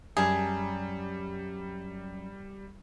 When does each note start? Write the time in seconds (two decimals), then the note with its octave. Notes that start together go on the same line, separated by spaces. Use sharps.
0.17 F#2 G3 G#4 A5 A#5